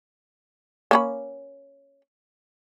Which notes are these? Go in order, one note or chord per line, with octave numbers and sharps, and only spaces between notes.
A#3 C#4 B5